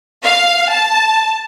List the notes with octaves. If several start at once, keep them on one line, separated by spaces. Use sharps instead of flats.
F5
A5